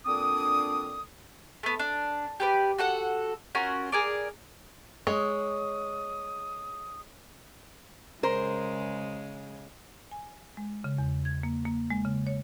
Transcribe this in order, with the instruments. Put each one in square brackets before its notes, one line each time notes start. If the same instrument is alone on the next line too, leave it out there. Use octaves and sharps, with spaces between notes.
[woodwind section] A#2 D3 C4 D4 D6 D#6
[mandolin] A3 B3
D4
G4 B4 D5
F#4 A4 F#5
C#4 F4 F#4 A#4
G#4 A#4 D5
[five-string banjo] G#3 [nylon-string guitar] C#5 [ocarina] D#6
[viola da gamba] C#3 G#3 [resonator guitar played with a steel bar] A#4 C5
[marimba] G#5
G#3
C#3
E2
G#6
A#3
A#3
G#3
C#3
C#5